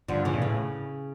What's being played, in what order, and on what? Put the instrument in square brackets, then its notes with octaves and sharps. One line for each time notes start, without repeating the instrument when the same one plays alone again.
[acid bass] G2 [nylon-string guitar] D3 F3
[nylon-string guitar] C#3 E3
[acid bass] A2
[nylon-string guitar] C#3